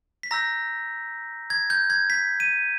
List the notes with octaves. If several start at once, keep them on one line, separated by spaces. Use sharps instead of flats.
B6
A#5 E6 G6 A#6
G#6
G6
G#6
B6
D#7